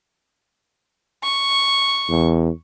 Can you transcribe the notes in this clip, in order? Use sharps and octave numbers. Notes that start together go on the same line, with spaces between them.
C#6
E2